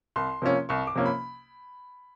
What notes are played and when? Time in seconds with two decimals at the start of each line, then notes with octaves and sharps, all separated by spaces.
0.16 C2 C6
0.42 C3 F3 A#3 C#4
0.69 C2 C#6
0.87 D6
0.95 C3 F3 A#3 C#4
1.06 B5